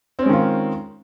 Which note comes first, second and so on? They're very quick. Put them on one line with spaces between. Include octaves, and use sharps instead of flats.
C4 C#4 G#3 D#3 F4